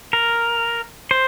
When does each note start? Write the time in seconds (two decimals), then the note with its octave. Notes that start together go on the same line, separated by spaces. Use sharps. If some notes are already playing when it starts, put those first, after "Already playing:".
0.13 A#4
1.11 C5